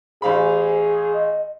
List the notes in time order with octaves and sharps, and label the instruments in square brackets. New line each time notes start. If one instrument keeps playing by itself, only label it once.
[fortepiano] A1 F5 B5 [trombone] G#4 [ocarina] C5
[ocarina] D#5